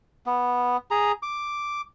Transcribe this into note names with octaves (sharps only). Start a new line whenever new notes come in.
B3
G#4 A#5
D6